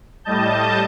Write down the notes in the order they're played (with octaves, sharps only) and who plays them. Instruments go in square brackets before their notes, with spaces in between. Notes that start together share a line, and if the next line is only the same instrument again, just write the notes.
[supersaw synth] A2 G3 D#5 A5 G6